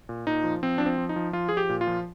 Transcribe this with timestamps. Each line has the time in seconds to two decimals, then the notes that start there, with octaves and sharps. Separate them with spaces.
0.09 A#2
0.27 A#2 D#4
0.44 F3
0.63 F3 C4
0.78 F3 D4
0.86 C4
0.98 F3
1.09 D#4
1.16 F3
1.33 F3 F4
1.49 F3 G#4
1.57 G4
1.69 A#2
1.81 F4
1.87 F3